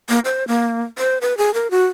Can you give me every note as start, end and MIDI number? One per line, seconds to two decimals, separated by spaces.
0.09 0.19 58
0.25 0.46 72
0.48 0.81 58
0.98 1.18 72
1.21 1.37 71
1.38 1.53 68
1.54 1.70 70
1.71 1.86 66